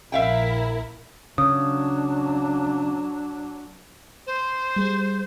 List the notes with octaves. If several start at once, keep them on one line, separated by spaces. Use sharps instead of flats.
A#1 E4 A#4 E5 F5 G5
C#3 F#3 D4 D#6
C5
G3 G#4